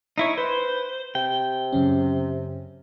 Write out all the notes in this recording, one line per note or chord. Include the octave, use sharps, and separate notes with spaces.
D#4 E4 C#5
B4 C5
C3 G5
F#2 C#3 C#4